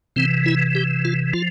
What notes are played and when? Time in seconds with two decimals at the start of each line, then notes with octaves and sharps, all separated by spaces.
0.16 C3 E3 C4
0.46 E4
0.75 G4
1.05 F4
1.33 F3 F4